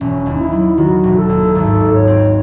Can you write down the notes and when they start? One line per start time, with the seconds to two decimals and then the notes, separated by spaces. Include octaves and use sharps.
0.01 E1 C#4
0.26 D#2
0.39 E4
0.52 F#3
0.78 D#3 F#4
1.04 E1
1.17 A4
1.29 D#2
1.55 G#1 A4
1.81 G#2
1.93 C#5
2.07 C4